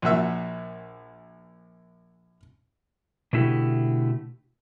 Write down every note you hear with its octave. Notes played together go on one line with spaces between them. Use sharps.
A#1 A#2 F#4 E5
B2 D3 A3 E4 F#4 G4